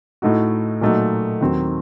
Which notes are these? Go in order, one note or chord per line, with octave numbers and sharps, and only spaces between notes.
A2 A3 D#4 F#4
A#2 F#3 A3 D#4 F#4
D#2 D#3 F#3 C4